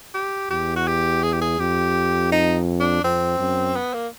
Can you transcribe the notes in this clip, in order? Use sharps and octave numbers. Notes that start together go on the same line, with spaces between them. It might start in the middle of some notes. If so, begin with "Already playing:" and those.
G4
E2 G4
F#4
G4
G#4
G4
G#4
F2 G4
D#4
D4
F2 C4
F#2
B3
A#3